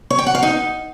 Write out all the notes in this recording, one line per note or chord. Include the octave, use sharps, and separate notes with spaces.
C#5
G5
F#5
F5
D#4